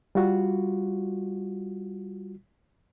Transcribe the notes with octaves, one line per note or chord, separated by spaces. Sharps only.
G3 F4 F#4